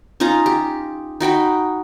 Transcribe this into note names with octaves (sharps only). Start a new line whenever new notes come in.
C#4 D#4 F4 A#5
G4
D#4 F#4 G5 B5